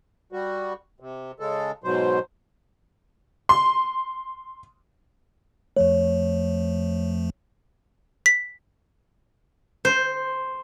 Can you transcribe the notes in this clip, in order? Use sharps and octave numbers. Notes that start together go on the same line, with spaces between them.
G3 F#4
C3
C#3 G#3 A4
G#2 B2 F#3 C5
C6
F2 F3 A3 C#5
B6
C5